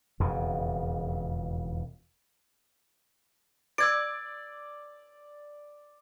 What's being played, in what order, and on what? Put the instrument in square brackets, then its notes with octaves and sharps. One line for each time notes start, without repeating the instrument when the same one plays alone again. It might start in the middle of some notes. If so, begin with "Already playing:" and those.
[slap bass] E1 F2 C#3
[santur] D5 [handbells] E6 G#6 D7